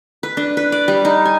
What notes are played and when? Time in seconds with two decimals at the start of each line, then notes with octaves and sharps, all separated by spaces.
0.23 B4
0.37 D4
0.57 B4
0.72 D5
0.88 G3
1.05 D#4
1.25 G#5